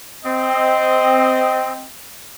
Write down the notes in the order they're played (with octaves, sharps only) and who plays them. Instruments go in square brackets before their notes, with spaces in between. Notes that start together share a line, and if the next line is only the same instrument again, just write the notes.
[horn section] C4 D#5